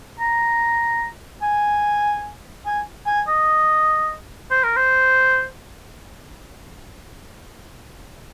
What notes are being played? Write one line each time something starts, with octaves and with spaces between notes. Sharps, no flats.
A#5
G#5
G#5
G#5
D#5
C5
A#4
C5